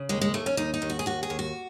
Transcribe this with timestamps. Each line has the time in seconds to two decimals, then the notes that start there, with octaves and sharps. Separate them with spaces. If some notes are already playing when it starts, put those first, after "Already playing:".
Already playing: C#3
0.09 D#2 G#3
0.21 G#3
0.34 D#2 A3
0.46 C#4
0.57 D#2 D#4
0.74 D#4
0.82 D#2
0.90 F#4
0.99 G#4
1.06 D#2 F#4
1.23 G#4
1.30 D#2
1.39 F#4